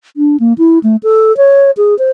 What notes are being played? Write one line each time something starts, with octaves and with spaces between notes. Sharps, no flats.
D4
A#3
E4
A3
A4
C#5
G#4
C5